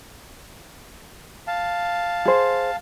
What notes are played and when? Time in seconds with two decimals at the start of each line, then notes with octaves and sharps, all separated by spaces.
1.47 F5 A5
2.25 G#4 C5